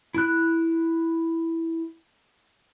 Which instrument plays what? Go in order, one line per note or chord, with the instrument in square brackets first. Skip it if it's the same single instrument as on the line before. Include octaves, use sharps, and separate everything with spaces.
[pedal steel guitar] E4 F#6